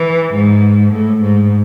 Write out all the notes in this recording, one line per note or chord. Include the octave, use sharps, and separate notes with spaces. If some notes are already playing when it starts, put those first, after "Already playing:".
Already playing: E3
G#2
A2
G#2